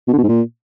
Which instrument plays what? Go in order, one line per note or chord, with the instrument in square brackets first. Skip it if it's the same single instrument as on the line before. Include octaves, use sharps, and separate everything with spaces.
[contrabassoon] B2
D3
B2
G#2
A#2